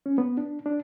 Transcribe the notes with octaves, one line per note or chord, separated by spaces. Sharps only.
C#4
B3
D4
D4